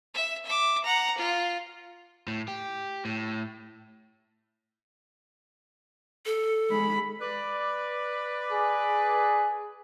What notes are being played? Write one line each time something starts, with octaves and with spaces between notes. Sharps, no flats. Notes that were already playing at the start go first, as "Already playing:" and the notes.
E5
E5 D6
F#5 A#5
F4
A2
G4
A2
A4
G#3 B5
B4 D5
G#4